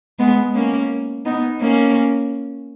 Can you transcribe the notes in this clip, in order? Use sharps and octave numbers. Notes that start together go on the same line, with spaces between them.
G#3 B3
A#3 C#4
B3 D#4
A#3 C#4